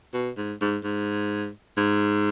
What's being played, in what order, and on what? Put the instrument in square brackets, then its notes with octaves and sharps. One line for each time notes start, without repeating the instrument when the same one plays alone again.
[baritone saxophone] B2
G#2
G#2
G#2
G#2